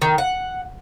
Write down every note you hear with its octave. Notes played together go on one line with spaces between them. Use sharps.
D#3
F#5